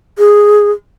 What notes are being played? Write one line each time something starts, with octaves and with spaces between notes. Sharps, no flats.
G#4